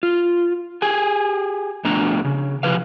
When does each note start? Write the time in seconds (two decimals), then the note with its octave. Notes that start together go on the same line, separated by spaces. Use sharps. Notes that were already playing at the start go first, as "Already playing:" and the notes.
0.03 F4
0.82 G4 G#4 G#5
1.84 F2 B2 A3 D4 A#5
2.24 C#3
2.63 C3 F3 B4 F5